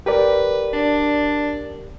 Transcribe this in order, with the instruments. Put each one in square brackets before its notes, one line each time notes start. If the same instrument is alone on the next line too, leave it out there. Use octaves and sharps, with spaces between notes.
[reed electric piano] G4 A#4 D5 [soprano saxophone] B4
[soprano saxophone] D4